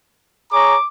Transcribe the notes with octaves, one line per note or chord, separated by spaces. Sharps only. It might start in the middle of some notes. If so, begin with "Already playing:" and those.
G#4 C#5 A#5 D6